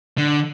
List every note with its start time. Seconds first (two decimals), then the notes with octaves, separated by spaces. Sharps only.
0.18 D3